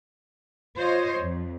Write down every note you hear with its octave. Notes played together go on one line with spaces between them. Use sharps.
F4 C5 C#5 D#5
F2